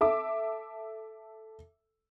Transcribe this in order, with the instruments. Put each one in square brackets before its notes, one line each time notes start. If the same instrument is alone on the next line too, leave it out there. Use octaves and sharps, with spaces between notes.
[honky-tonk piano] A4 E5 D6